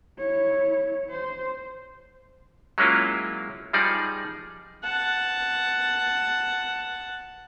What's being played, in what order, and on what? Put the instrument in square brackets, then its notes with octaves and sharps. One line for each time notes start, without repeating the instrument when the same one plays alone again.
[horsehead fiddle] E4 C#5
C5
[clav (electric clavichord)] F#3 G#3 A#3 C#4 E4 F4
F3 G3 D#4 G#4 D5
[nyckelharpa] F#5 A5